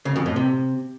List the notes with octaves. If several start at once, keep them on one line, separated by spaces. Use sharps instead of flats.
C#3
F2
A2
C3